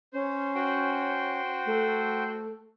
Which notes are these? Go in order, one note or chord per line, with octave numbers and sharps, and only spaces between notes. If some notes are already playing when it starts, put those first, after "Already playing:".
C#4 C5
F#4 C5 G5
A3